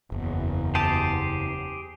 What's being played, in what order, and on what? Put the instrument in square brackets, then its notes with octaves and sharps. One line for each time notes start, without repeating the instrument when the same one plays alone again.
[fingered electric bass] F#1 [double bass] E2
[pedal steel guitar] G4 G#4 C5 [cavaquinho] A5